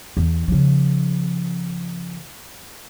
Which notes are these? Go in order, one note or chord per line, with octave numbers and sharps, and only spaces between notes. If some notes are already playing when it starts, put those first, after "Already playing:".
E2
C#3 F3